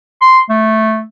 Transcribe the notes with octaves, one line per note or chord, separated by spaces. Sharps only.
C6
A3